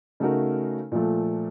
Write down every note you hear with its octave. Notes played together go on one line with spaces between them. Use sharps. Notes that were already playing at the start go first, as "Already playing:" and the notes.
C#3 A3 D#4 F#4 A#4
A#2 F3 A3